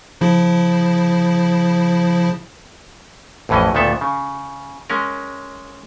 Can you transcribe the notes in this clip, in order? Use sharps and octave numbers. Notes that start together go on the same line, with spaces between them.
C#3 F3 E4
A1 F2 A2 E3 C#4 D#5
D2 A#2 D#3 B3 A4 E5
C#3
G#3 C#4 A#4